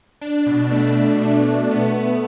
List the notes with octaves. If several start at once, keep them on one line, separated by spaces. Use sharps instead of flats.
D4
B2
A3
A3
A3
A3
B3
B3